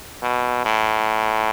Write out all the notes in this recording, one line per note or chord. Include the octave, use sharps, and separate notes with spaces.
B2
A2